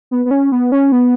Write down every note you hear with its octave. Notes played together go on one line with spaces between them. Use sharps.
B3
B3
C#4
B3
C#4
B3